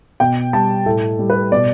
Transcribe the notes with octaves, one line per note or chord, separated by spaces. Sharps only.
B2 G5
G3 A5
A2 A4
G3
B4
B2 D5